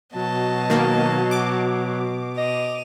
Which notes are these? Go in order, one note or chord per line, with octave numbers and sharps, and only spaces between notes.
B2 F#3 D#5 A5
D#3 A#3
D6
D#5 D#7 F7